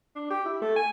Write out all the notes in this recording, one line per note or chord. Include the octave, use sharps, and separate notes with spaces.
D4
G4
E4
A3
G#5